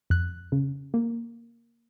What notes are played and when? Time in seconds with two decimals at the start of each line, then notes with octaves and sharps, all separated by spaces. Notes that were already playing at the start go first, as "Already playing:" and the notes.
0.10 F2 F#6
0.52 C#3
0.94 A#3